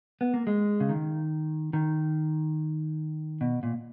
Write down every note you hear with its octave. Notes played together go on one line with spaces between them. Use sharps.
B3
A#3
G#3
C#3
D#3
D#3
B2
A#2